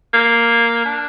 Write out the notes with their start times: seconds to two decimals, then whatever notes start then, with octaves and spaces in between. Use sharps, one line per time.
0.14 A#3
0.85 D4